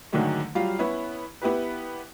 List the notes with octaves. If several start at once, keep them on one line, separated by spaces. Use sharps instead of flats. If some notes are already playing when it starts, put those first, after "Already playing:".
G#2 D3 D#3 F#3 G#3 A3
F#3 G3 F4 F5
B3 C#4 E4
B3 E4 G4 B4